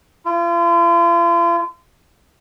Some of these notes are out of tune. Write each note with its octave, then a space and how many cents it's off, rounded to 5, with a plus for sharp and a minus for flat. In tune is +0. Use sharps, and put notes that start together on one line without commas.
F4 -40